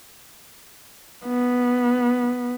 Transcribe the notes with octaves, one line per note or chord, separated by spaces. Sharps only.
B3